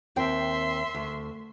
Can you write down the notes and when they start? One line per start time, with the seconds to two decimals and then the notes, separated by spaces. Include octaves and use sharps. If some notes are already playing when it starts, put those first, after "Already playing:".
0.16 D#2 C4 E5 G5 C6
0.94 D2